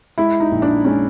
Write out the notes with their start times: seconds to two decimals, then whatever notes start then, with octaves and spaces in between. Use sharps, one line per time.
0.18 G#3 E4
0.40 D#4
0.51 A#1
0.62 D4
0.85 G#3 C#4